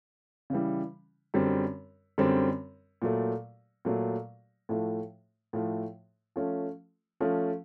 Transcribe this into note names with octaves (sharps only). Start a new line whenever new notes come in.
C#3 E3 G3
F#2 D3 G3 C4
F#2 D3 G3 C4
A#2 F#3 A3
A#2 F#3 A3
A2 F3 A3
A2 F3 A3
F3 A3 C#4
F3 A3 C#4